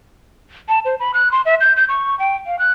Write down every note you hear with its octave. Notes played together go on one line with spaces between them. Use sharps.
A5
C5
B5
F#6
C6
E5
G6
G6
C#6
G5
F5
F#6